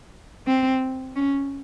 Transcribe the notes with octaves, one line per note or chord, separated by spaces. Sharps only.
C4
C#4